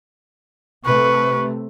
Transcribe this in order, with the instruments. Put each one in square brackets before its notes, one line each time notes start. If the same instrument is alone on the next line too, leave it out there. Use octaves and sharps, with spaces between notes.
[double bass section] C3 A3 [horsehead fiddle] B4 [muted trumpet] C#6